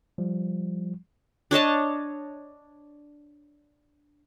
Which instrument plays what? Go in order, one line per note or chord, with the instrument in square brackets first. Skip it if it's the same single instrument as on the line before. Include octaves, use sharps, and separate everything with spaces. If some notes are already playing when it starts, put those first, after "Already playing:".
[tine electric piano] F3 G3
[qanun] D4 C#5 D#5 A5